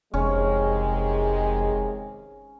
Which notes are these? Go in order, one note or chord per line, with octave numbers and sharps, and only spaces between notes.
F1 C3 D#3 G#3 C#4